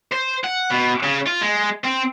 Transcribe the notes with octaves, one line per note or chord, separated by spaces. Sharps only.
C5
F#5
B2
C#3
F4
G#3
C4